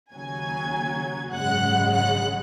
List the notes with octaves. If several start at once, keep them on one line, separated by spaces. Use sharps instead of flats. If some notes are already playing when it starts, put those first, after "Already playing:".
D#2 C#3 F#3 G#5 G#6
G#1 F#2 C#3 G#3 F#5 F#6
F#5 F#6